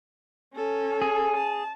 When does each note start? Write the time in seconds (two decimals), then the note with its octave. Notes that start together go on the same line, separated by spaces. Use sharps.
0.54 C#4 A4
1.02 G#4
1.37 A5